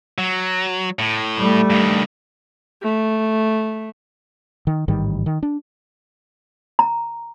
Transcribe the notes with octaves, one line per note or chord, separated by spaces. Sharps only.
F#3
A2
G3 A3
G2 D#3
A3
D#3
A1 G#2 D#3 G3
D#3
D4
A#5